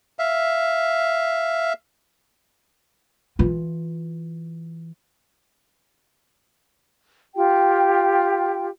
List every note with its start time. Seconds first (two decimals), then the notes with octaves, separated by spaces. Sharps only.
0.19 E5 F5
3.39 E3 F4
7.35 F4 G4 G5